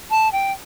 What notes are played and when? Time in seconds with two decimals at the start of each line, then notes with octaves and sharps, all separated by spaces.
0.10 A5
0.32 G5